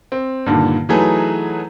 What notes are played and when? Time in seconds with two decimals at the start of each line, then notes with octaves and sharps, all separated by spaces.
0.12 C4
0.46 G2 A#2 D3 D#3
0.89 E3 F#3 A3 D#4 G#4 B4